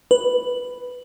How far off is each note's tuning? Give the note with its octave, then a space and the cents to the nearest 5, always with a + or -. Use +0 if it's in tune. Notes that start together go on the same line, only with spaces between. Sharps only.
B4 +5